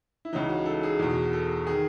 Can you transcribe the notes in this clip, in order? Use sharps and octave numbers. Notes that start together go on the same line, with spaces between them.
E4
C#2 C#3 E3 D#4
F#4
A4
G#4
E2 B2
A4
D#3 G#4